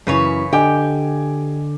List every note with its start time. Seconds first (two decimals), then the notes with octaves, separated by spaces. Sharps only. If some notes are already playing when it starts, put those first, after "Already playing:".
0.07 F#2 C#3 E3 B4 C#5
0.53 D3 G4 D#5 G5 G#5 D6